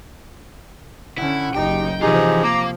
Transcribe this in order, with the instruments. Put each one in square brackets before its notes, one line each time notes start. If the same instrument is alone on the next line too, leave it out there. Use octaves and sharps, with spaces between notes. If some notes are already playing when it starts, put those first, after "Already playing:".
[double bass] D3 C#4 [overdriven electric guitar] E4 [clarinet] F#5
[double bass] F#1 D#4 [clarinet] G4 [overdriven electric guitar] G5
[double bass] C3 F3 [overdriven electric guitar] E3 F4 [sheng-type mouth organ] D#4 G#4 [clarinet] G4
[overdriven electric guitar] A#3 [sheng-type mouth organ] A#5 [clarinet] D6